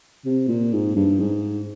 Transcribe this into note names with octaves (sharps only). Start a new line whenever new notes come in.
C3
A#2
G#2
G2
G#2